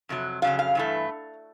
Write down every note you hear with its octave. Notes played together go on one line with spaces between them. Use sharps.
F2 C3 F#3
F2 C#3 F#3 F5
F5
G2 E3 A3